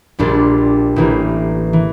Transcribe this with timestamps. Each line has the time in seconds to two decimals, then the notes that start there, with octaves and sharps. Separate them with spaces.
0.19 A#1 A#2 G3 D4
0.96 A1 A2 E3 A#3
1.73 E3